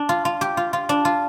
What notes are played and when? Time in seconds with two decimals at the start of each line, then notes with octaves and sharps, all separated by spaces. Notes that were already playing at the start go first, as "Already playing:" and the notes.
Already playing: D4
0.09 F4
0.25 F4
0.41 G4
0.57 F4
0.73 F4
0.89 D4
1.05 F4